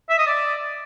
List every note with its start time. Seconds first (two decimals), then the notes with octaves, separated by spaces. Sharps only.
0.10 E5
0.18 D#5
0.27 D5